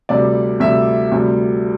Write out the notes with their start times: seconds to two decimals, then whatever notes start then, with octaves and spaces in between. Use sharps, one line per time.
0.09 D2 C3 G3 D5
0.60 D2 C3 G3 E5
1.12 D2 C3 G3